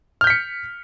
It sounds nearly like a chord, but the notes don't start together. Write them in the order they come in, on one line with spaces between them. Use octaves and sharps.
F6 G6 B6 C#7